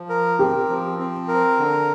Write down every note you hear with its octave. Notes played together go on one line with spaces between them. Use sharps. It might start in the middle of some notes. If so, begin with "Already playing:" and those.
Already playing: F3
A#4
C4 G4
F3
C4
A#4
D3